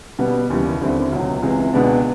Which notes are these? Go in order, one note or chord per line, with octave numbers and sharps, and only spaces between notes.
B2 G3 B3
D#2 C#3 E3 G3
D#2 D3 G3 C4 E4
C#2 B2 F#3
C#2 C3 E3 G#3
C#2 B2 G#3 B3 D4